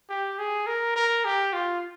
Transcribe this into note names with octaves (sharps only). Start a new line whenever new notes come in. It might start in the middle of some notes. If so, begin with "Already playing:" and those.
G4
G#4
A#4
A#4
G4
F4